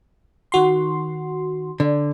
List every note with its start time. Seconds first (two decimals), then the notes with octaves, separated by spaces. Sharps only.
0.52 D#3 F#4 C6
1.80 D3